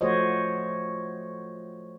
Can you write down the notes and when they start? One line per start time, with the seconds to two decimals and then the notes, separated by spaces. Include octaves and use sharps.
0.01 F3 A3 F#4 C5 C#5 D#5